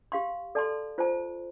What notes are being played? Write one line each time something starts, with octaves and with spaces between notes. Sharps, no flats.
G4 F5 C6
A4 D5 A5 C6
F4 C5 A5